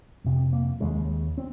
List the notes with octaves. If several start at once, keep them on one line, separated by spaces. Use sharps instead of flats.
F2 C3
A#3
D#2 C#3 G#3
C4